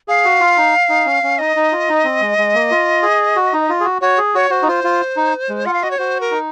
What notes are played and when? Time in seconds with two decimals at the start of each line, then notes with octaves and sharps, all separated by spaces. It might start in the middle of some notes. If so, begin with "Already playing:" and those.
0.08 G#4 F5
0.25 F#4
0.40 F4
0.57 D#4
0.89 D#4
1.06 C#4
1.23 C#4
1.39 D#4 D#5
1.56 D#4
1.72 F4
1.89 D#4
2.04 C4
2.21 G#3
2.38 G#3
2.55 A#3
2.71 F4
3.03 G#4
3.36 F#4
3.53 D#4
3.70 F4
3.80 G#4
3.85 F#4
4.01 F#4 C#5
4.18 G#4
4.35 F#4 C#5
4.50 F#4 C5
4.63 D#4
4.68 F4 C5
4.84 F4
5.17 D#4
5.49 G#3
5.66 F4 F#5
5.74 F5
5.83 F#4 D#5
5.91 C#5
5.98 F#4 C5
6.21 A#4
6.31 D#4